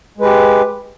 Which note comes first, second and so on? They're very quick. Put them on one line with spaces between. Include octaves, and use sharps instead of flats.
G#3 B4 G4